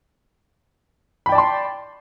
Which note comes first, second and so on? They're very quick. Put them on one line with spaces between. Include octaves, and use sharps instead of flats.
B5 G5 D5 A5 C6